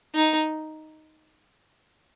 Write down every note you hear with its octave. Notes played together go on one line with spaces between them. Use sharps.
D#4